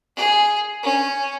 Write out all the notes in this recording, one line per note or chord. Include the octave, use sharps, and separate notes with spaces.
G#4
C#4